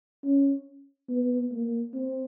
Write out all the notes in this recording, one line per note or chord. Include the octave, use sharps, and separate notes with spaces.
C#4
B3
A#3
C4